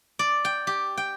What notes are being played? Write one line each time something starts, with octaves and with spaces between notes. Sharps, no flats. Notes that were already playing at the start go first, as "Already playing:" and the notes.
D5
G5
G4
G5